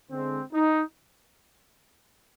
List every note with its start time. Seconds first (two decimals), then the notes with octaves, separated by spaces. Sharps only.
0.10 D3 G#3 C4
0.53 D#4